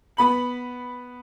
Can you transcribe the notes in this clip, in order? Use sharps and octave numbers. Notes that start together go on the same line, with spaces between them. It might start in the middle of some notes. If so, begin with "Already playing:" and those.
B3 B5 F#7